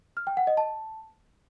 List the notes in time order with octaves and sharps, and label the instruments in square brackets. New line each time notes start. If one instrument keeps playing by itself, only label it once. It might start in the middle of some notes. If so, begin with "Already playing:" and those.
[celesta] F6
G5
F#5
D#5
A5